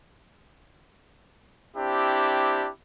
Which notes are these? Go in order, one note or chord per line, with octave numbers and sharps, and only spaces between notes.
C4 D4 E4 G4